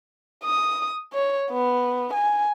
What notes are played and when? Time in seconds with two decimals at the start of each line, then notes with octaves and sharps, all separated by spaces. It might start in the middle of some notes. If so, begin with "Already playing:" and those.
0.44 D#6
1.13 C#5
1.51 B3
2.14 G#5